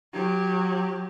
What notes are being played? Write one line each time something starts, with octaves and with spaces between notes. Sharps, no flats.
F#3 G4